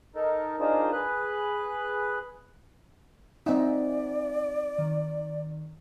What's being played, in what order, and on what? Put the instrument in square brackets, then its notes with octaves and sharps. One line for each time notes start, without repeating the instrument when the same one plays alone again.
[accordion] D#4 A4 A#4
D4 D#4 F4 G#4 A#4 C5
G#4 B4 F#6
[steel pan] C4 D#4 [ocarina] D5 [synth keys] E5 F#5 G#5
[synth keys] D#3